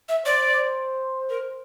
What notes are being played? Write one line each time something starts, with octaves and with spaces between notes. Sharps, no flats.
E5
C5 D5
A#4